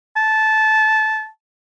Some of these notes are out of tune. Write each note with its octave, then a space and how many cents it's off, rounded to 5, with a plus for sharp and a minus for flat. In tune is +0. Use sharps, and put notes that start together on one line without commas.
A5 -15